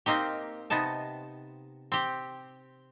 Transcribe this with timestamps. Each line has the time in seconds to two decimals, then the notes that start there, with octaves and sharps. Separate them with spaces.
0.06 A#3 C4 D#4 G4
0.70 C3 B3 D#4 A5
1.92 C4 G4